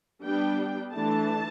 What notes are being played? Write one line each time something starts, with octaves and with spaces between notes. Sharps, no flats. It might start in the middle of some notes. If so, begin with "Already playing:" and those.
G3 B3 D4 G5
E3 A3 D4 A5